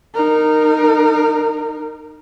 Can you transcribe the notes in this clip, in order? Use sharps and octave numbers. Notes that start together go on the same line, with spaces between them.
D#4 A#4